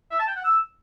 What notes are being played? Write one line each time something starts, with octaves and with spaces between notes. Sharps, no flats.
E5
A5
G5
F#5
E6